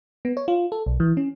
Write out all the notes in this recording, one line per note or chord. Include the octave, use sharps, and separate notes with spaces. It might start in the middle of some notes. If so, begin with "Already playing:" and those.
B3
C#5
F4
A4
B1
E3
C#4